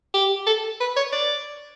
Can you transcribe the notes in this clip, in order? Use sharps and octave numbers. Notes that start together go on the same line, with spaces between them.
G4
A4
B4
C#5
D5